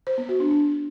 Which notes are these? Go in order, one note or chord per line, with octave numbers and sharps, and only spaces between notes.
C5
B3
F#4
D4
D4